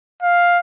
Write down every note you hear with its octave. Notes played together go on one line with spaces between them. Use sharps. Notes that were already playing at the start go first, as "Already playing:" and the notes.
F5